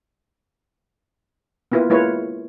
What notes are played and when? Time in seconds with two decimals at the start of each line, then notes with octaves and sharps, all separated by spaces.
1.72 A#3 B3 E4 F4 B4
1.90 G#3 A#3 E4 F4 B4 C#5